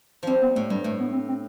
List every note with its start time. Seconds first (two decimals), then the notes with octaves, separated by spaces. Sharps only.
0.23 F3 G3 C4
0.42 B3
0.55 A2 A3
0.70 G2 G3
0.84 A2 A3
1.00 B3
1.13 C4
1.28 C4